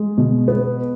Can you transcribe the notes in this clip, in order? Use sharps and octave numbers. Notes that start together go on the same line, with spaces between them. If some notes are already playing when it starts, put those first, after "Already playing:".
Already playing: G#3
B2
B3